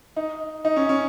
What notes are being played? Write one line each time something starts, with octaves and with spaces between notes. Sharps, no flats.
D#4
D#4
C#4
C#4